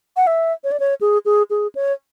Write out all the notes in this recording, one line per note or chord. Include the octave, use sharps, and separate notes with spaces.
F#5
E5
C#5
D5
C#5
G#4
G#4
G#4
C#5